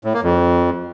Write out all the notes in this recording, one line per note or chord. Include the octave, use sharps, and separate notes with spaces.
A2
A#3
F2